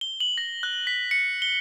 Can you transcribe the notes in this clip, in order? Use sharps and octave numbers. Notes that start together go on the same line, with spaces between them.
G7
F#7
A#6
F#6
B6
C#7
G7